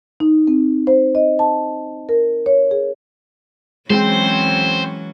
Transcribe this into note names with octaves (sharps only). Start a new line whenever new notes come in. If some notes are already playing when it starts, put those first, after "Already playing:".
D#4
C4
C5
D#5
A5
A#4
C#5
G#4
E3 F#3 G#3 C4 C#4 C5